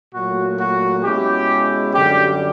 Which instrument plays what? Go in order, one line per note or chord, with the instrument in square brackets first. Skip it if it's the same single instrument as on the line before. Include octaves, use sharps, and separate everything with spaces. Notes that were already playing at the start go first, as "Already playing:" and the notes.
[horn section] A#2 F#3 A3 F#4
F#4
B2 G#3 C#4 E4 G4
F#2 D3 G3 G4